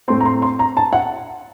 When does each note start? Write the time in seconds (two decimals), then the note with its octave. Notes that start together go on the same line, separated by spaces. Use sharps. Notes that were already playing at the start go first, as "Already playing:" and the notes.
0.08 A2 A3 C4 C6
0.20 A#5
0.25 C6
0.42 C6
0.59 A#5
0.77 A5
0.93 F#5